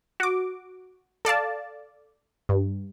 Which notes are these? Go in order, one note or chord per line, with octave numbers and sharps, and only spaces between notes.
F#4 D6
A4 D5 F5 A5
G2